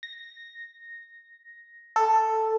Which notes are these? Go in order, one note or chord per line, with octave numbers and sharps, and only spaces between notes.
A#6
A4